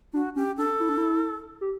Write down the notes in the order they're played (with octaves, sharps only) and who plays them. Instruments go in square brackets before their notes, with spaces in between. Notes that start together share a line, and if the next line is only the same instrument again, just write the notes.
[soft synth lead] D4 [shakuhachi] F#4
[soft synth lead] C#4 [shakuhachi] G4
[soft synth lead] D4 [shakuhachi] A4
[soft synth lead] E4
D4
E4
G4